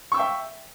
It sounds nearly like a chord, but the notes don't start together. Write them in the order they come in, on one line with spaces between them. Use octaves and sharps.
C#6 E6 G5 E5